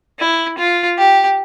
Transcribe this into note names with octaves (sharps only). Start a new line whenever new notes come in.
E4
F4
G4